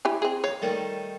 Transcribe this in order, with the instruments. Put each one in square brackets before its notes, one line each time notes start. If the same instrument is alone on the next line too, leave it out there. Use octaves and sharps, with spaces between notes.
[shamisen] E4 G4 G#5
C4 G#4
[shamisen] C#5 [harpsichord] F5
[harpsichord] D#3 G3 A3